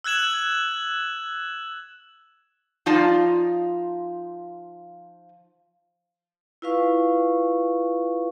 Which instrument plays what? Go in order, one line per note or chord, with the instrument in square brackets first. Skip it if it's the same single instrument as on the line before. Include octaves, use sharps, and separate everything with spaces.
[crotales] E6 F#6 G#6 E7 F#7
[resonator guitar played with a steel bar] F3 D#4 F4 D5 A5
[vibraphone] E4 F4 B4 F5 C#6